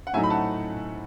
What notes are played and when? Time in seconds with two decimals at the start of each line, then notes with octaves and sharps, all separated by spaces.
0.07 F#5
0.13 A2 F#3 A3 D#4 E5 G#5
0.23 B5
0.30 F#5 A5